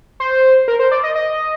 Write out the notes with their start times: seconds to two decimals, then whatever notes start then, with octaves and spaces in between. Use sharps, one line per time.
0.20 C5
0.68 A#4
0.79 C5
0.91 D5
1.03 D#5
1.15 D#5